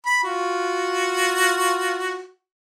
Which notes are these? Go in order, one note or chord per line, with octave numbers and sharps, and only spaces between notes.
B5
F4 F#4